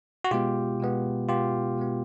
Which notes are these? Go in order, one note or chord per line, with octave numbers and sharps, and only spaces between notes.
F#4
B2 G#3 B3 F4 G4
B2 G#3 B3
B2 G#3 B3 F4 G4
B2 G#3 B3